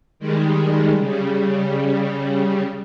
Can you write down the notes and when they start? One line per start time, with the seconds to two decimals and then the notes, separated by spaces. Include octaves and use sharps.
0.19 D#3 G3 G#3
0.98 C#3 G3